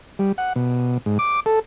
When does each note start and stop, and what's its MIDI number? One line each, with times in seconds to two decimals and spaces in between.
0.19 0.32 55
0.38 0.53 78
0.56 0.98 47
1.06 1.18 44
1.19 1.40 86
1.46 1.59 69